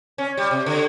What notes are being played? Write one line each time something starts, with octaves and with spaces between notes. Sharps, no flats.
C#4
G3
C3
D3